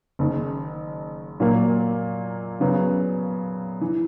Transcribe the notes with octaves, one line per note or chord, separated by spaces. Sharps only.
F#1 F#2 D#3
A#2 F#3 A#3
F#2 C#3 F#3 B3
E3